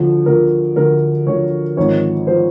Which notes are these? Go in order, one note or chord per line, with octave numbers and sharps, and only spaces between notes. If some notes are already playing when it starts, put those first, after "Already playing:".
Already playing: D2 D3 F3
D2 D3 F3 A#4
D2 D3 F3 A#4
D2 D3 F3 C#5
G#1 G#2 F3 C#5
F3 C5